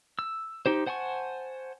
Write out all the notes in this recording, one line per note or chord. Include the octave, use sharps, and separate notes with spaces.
E6
D#4 G4 C5
C5 F#5 G#5 A5 C#6